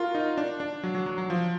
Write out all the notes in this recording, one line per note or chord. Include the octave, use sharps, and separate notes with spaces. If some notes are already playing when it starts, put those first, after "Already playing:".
Already playing: F4 F#4 A#4
D#4
D4
D4
F#3
F#3
F#3
F#3
F3